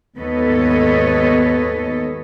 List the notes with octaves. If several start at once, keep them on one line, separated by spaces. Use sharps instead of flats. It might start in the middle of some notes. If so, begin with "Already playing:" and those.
D#2 G#2 B3 A4 C#5 D#5